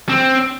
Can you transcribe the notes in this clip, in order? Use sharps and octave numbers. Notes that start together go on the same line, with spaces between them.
C4